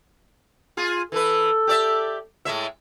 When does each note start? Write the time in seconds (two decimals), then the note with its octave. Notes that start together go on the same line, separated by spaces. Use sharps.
0.77 F4 G#4
1.12 E3 A4 B4
1.67 G4 D5 E5
2.45 A2 G#3 E5